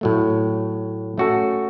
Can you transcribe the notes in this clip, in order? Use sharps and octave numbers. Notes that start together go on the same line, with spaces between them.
A2 F#3 A3
A3 C#4 F#4 A4